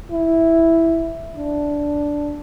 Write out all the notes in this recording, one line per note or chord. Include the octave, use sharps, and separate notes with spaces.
E4
D4